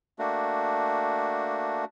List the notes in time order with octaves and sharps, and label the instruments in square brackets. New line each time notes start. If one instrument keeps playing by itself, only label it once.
[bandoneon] A3 A#3 D4 F#4